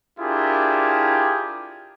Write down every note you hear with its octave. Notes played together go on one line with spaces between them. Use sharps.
D4 E4 F4 G4 G#4 A#4